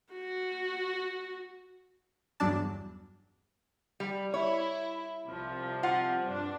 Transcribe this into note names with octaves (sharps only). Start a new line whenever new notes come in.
F#4
G1 E2 G2 F#3 D4 A5
G3
E4 C#5
C2 C3 F3
F4 F#5
G2 D4